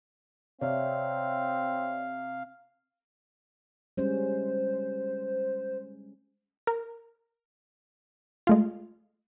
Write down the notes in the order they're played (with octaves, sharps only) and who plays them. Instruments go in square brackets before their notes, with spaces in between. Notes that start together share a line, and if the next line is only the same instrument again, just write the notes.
[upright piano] C3 [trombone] C4 [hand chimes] C#5 D5 E5 [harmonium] F5
[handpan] G3 G#3 C#4 [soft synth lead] C5
[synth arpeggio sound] A#4
G#3 A3 F4